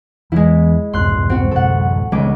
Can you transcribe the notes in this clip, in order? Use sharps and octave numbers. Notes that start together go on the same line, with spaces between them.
E2 E3 G#3 E4
C2 F2 G#2 C6 F#6
C4 F#4
D1 A1 F#2 A4 F#5
C#2 D#3 G3 G#3 C#4 D6